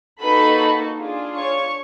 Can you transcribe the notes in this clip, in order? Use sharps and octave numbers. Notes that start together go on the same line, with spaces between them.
A#3 D#4 F#4 A4 B4 B5
D4 F4 G#4
C#5 C#6